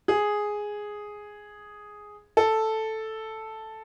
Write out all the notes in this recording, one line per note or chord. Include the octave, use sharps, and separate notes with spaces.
G#4
A4